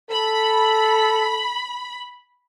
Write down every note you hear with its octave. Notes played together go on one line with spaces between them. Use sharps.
A4 B5